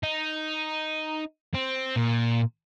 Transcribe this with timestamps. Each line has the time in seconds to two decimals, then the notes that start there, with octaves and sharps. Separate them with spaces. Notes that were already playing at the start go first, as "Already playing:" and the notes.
0.03 D#4
1.54 C4
1.96 A#2